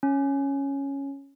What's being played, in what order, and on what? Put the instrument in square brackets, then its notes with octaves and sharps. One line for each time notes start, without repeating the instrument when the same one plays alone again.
[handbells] C#4